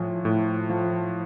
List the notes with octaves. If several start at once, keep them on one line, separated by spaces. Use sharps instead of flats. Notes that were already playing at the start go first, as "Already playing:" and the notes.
Already playing: A2 F3 G#5
A2
F3